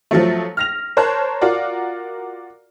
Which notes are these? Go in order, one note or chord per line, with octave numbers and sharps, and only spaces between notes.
F3 F#3 A3
F6 A#6 F7
A#4 C5 C#5 A5 F#6
F4 F#4 A#4 D5